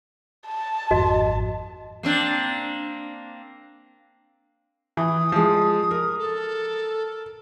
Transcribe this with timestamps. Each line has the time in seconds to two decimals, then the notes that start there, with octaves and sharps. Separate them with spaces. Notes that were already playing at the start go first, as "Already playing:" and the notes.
0.47 A5
0.91 G#1 F2 F#4 D#5
2.03 A#3 C4 D4
4.97 E3 D#6
5.32 F3 G#3
5.91 A#4
6.18 A4